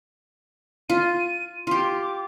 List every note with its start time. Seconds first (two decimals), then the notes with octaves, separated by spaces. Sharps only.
0.90 F4 D#7
1.67 F4 G4 C6
2.01 D6